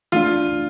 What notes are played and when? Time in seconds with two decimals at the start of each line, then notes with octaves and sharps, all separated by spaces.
0.12 E3 A3 D4 F4